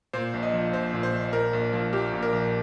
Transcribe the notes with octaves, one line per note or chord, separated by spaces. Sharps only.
A#2 C5
A#1
D#5
F3
A#1 C5
A#2
C5
A#1
A#2 A#4
A#1
F3
A#1 G4
A#2
A#4
A#1